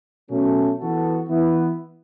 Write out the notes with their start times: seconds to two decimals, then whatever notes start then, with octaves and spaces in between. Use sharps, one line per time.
0.29 B2 F#3 A3 C#4
0.79 E3 B3 F#4 A4
1.29 E3 B3 E4